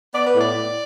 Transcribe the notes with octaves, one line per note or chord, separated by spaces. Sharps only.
B3 D5
B4
A2 D5
A2